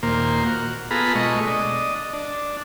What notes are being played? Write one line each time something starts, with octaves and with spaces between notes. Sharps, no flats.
D#2 A#2 A#3 C5
F#4
B3 F4 G#4 A4 A#5 B5
B2 G#3 A3 D#5 C#6
D4 D#5
D4